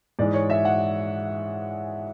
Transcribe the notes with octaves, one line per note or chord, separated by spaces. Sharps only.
G#2 E3 G#3 D5
C#5
E5
F#5